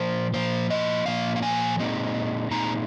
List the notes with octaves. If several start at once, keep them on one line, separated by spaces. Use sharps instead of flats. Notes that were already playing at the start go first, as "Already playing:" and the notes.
Already playing: A#2 F3 A#3 C5
A#2 F3 A#3 C5
D#5
A#2 F3 A#3 F5
F5
G#5
A#2 G#3 C4 D#4
A#2 G#3 C4 D#4 A#5